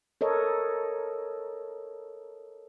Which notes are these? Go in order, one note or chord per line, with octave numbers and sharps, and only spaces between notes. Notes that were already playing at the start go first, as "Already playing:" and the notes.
A4 A#4 C#5 D#5